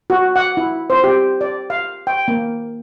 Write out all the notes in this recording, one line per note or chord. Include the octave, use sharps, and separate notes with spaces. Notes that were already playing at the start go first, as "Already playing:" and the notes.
F#4
F#5
E4
C5
G4
D5
F5
G5
A#3